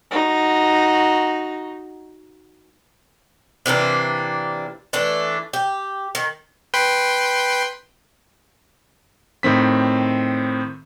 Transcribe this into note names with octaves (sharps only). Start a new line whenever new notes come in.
D#4 F#4
C3 E3 A#3 D4
E3 A3 D4
G4
D#3
B4 G5 C6
A2 D#3 C4 B6